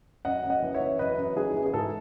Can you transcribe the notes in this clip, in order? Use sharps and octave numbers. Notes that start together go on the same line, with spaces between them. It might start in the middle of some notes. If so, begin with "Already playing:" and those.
F#2 D#5 F#5
F#2
D#5 F#5
E3
C#5 E5
E3
F#2 B4 D#5
F#2
E3 G#4
E3
G#4
G#2 A4